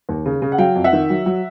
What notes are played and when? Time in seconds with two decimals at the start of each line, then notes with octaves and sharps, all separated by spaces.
0.09 D#2
0.26 C#3
0.42 C#3
0.52 F#5
0.58 F#3 F5 G5
0.75 F2
0.84 E5 F#5
0.93 D#3
1.10 F#3
1.26 F#3